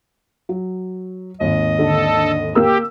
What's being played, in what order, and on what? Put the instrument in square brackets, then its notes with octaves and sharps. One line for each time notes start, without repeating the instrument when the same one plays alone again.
[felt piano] F#3
[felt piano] G#1 D#2 [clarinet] D#5
[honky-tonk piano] D3 [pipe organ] A4
[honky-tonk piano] A#3 E6 [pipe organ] G4